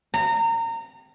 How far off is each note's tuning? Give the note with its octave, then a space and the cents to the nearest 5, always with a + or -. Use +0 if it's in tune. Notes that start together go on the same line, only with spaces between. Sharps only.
A#5 -25